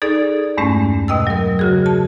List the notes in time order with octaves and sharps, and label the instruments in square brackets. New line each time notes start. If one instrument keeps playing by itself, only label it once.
[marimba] D#4 G#4 A4 D5
E2 G2 G#3 A3 C#4
B2 D#5 G5 E6
F#3 A#4
C#3 F#4 G#4
A5